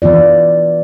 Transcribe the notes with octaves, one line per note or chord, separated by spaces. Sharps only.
E3 B3 F4 D5